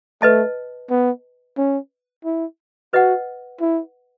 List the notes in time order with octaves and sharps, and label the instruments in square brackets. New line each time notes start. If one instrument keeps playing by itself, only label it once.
[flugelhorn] A3 [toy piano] B4 D#5 A5
[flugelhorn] B3
C#4
E4
[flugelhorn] F#4 [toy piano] B4 D#5 F#5
[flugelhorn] E4